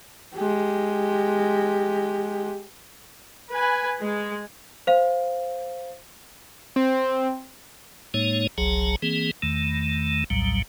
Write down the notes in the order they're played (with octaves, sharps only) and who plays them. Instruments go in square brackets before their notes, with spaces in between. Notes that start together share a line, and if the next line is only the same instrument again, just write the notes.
[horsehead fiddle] G#3 G4
[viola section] B4 G#5
G#3
[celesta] C5 F5
[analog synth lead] C4
[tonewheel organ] A2 G#3 A#3 D#4 C#5
F#1 C2 F#3 G#4 A5 A#5
E3 A#3 C4 G#4
E2 D#3 A3
A#1 D#2 A2 F#3 G3